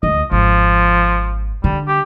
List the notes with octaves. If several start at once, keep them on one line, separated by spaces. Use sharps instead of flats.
D2 D#5
G#1 F3
D3 G3
G4